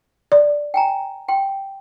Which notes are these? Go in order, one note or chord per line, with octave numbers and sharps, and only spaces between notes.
D5
G5 G#5 A#5
G5 C6